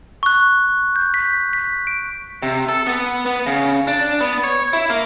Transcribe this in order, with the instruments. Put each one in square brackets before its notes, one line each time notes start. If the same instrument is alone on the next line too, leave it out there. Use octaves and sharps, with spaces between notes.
[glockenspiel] C#6 F#6
G6
B6
B6
D7
[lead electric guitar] C3
A4
B3
B3
C#3
D4
B3
C#5
E4
A#3